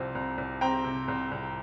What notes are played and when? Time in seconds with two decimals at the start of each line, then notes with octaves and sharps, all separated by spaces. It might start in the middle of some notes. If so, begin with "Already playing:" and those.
Already playing: C2 C3 F3 C4
0.15 C2
0.38 C2
0.61 C4 G5 A#5
0.84 C3
1.08 C2
1.31 C2